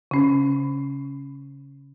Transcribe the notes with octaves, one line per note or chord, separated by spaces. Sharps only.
C#3 C#4